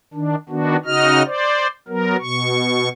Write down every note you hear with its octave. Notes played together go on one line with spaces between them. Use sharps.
D#3 D4
D#3 B3 D4 F#4
C#3 D#4 F#4 D#5 F6
C5 D5
F#3 B3 A#4
B2 C#6